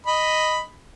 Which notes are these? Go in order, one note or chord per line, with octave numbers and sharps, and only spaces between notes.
D#5 B5